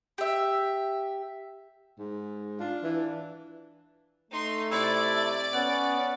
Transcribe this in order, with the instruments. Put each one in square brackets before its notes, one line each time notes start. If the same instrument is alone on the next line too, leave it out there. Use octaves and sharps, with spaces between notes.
[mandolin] G4 E5
[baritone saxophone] G#2
[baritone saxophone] D4 [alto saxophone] F4
[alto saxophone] E3
[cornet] A3 [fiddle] D#4 C6
[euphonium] C3 [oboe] E4 [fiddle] D5
[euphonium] B3 [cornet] C#4 [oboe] F#5